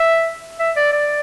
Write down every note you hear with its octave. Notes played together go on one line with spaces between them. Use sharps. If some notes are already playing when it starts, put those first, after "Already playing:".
Already playing: E5
E5
D5
D5